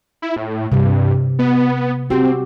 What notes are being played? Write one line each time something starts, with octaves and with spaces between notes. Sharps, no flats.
E4
A2
G2 C3
B3
C4 F#4 G4